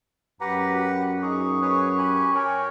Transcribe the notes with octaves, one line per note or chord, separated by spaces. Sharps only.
F#2 G4 B4 F#5 A#5
F#4
D#4 G#4 C#6
G#4 B4 C#5
G4 G#5 B5
A#4 C#5 G5 G#5